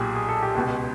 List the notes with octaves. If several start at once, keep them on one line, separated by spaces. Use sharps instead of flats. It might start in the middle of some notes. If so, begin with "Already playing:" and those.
Already playing: B1 A#2 G4 G#4
G#4
A4
G4
C#2 B2